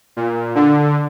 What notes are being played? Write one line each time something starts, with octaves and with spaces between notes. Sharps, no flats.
A#2
D3